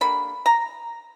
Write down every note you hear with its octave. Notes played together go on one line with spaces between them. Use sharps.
D3 G3 A#3 B5
A#5